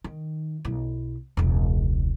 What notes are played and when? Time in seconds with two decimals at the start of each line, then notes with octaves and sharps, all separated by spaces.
0.04 D#3
0.65 B1 E4
1.37 E1 C#2